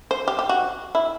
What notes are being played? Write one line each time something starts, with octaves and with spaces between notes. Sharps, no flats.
C5
G4
G4
F#4
E4